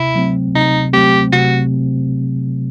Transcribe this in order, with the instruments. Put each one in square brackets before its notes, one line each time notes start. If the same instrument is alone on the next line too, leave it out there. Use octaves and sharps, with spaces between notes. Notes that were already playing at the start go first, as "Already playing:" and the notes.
Already playing: [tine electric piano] C3 [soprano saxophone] E4
[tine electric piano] F#3 A3 C4
[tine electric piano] C3 [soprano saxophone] D#4
[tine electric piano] F#3 A3 C4 [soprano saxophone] G4
[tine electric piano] C3 [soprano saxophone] F#4